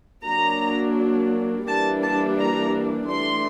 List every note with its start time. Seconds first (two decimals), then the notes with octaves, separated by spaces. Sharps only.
0.25 F#3 A#3 D4 A#5
1.67 E3 G3 A#3 D4 A5
2.03 A5
2.39 A#5
3.10 E3 A3 D4 C6